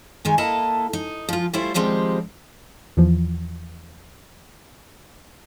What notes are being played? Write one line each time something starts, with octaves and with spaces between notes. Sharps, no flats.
D#3 G#3 G#5
A#3 E4 A4 D#5 A5
D#4
F3 F4
G3 A3 E4 F4 C5
D#3 F3 G3 G#3 C4
E2 E3 F3